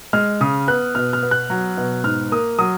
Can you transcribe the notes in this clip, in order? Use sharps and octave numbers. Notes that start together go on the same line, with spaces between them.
G#3 F6
C#3 D#6
B3 F#6
B2 F6
F6
B3
F#6
F#3
B2
G#2 F6
A#3 D#6
F#3 D#6